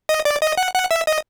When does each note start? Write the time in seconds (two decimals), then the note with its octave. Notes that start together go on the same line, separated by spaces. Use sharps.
0.09 D#5
0.25 D5
0.42 D#5
0.57 F#5
0.74 F#5
0.91 E5
1.07 D#5